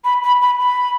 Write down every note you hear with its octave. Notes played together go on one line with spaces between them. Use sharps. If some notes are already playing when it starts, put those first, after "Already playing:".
B5
B5
B5
B5